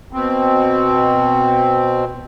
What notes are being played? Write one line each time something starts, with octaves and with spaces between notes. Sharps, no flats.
B2 C4